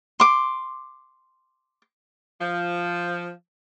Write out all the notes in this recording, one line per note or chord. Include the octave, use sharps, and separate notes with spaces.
C6 D6
F3